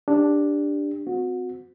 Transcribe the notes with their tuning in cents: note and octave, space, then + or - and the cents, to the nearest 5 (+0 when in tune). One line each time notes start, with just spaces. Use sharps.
D4 +0 G4 +20
C4 -35 F#4 -25